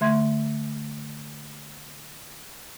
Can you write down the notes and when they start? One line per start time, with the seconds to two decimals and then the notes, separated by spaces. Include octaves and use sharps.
0.01 D3 A3 E5 C6 G#6